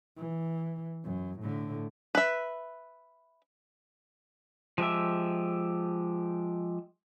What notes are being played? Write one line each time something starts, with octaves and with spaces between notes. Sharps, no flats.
E3
F#2
A2 D3
B4 E5
F3 G#3 G4 E5